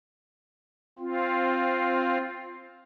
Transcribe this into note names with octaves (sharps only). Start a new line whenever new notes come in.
C4 F4